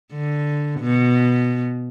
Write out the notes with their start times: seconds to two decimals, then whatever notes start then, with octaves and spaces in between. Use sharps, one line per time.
0.13 D3
0.80 B2